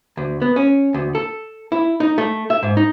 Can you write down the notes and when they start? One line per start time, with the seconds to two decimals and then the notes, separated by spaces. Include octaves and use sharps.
0.17 D2
0.42 B3
0.56 C#4
0.94 D2
1.15 A4
1.72 E4
2.00 D#4
2.18 A3
2.50 E5
2.63 G#2
2.77 D#4